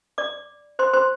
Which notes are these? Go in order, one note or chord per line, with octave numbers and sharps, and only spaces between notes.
D5 D6
C5 C6
C5 C6